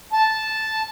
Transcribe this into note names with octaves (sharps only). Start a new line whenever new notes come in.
A5